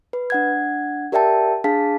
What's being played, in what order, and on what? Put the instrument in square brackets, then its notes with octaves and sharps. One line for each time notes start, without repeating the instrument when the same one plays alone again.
[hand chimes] B4
D4 F#5 G#6
G4 A#4 D5 E5 G5 A5
D4 G#4 F5 A5 B6